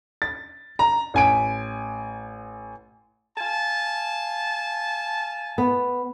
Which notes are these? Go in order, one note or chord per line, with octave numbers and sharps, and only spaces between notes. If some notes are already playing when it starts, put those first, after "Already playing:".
A6
A#5
A1 G#5 D7
F5 G#5 A5
B3